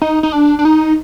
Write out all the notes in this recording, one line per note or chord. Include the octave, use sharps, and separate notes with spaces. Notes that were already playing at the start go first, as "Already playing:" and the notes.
D#4
D#4
D4
D4
D#4